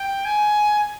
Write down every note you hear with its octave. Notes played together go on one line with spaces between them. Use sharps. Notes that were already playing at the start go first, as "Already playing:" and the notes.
Already playing: G5
G#5